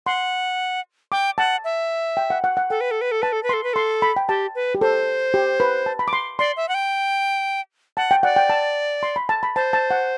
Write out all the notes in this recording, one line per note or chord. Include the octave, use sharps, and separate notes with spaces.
F#5 C6
G5 D6
F#5 A5
E5
G5
F#5
F#5
F#5
A4 G5
B4
A4
B4
A4
B4 A5
A4
B4
A4 C6
B4
A4 C6
B5
G5
G4 A5
B4
G4
A4 C5
G4
B4
A5
B5
D6
C6
D5 C6
E5
F#5
G5
F#5 A5
G5
D5 F#5
G5
A5
C6
B5
A5
B5
C5 A5
A5
F#5